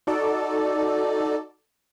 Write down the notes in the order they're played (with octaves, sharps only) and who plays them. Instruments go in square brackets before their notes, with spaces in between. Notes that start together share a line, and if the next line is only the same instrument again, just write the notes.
[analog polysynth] D#4 F#4 A4 D5